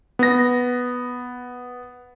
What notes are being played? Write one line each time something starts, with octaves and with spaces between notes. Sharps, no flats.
B3 A#6